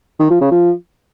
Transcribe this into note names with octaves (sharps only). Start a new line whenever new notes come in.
D#3
F3
C#3
F3